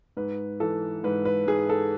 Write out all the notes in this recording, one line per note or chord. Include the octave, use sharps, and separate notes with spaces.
G#2 B4
E3 A4
G#2 B4
B4
G#2 G#4
A4